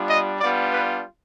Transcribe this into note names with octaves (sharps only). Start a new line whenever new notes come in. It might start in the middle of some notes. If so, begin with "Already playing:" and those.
Already playing: G3 B3 D4 F4
D#5
G3 B3 D4 F4 D5
B4